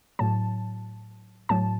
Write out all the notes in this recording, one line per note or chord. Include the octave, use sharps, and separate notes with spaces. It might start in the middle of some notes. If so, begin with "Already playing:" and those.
A2 F#3 A5
A2 F#3 A5